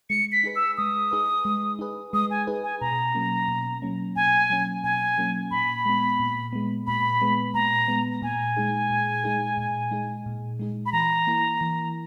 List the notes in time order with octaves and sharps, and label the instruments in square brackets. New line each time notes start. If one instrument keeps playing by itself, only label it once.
[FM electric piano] G#3 [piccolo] C#7
[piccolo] B6
[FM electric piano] D#4 G#4 B4
[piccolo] E6
[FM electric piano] G#3 [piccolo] D#6
[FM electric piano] D#4 G#4 B4
G#3
D#4 G#4 B4
[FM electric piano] G#3 [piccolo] D#6
[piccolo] G#5
[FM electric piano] D#4 G#4 B4
[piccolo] G#5
[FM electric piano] B2 [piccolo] A#5
[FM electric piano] F#3 A#3 C#4
B2
F#3 A#3 C#4
[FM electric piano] B2 [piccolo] G#5
[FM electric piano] F#3 A#3 C#4
[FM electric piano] B2 [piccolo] G#5
[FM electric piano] F#3 A#3 C#4
[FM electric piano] A#2 [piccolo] B5
[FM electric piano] G#3 B3
A#2
G#3 B3
[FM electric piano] A#2 [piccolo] B5
[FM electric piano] G#3 B3
[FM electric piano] A#2 [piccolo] A#5
[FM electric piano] G#3 B3
[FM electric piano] A#2 [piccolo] G#5
[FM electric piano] G#3 D#4 G#4
A#2
G#3 D#4 G#4
A#2
G#3 D#4 G#4
A#2
G#3 D#4 G#4
[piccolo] B5
[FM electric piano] E3 [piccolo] A#5
[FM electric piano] A#3 E4 A#4
E3